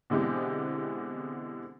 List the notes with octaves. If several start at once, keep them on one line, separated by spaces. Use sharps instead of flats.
B2 D3 E3 G#3 C4 G4